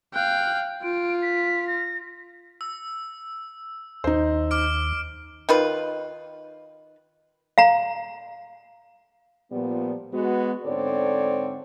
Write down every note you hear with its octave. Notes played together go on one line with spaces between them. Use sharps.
F5 G5 F#6
F4 D7
B6
A#6
E6
D#2 D#4 C5
D6 F6 D7
D#3 F4 B4
F5 A#5
A#2 F3 G3 B3
G#3 B3 F#4
G#2 D3 C4 A4 C#5 D5